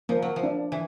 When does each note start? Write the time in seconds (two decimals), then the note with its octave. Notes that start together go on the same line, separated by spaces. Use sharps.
0.09 F3 A#3
0.22 F#3
0.36 F3
0.43 D4
0.72 E3